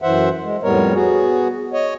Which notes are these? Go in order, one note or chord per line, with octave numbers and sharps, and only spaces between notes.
F#2 E3 C5 E5 F#5
G#3
F2 A2 G3 B3 A#4 C#5
B3 F#4 G#4
C#5 D#5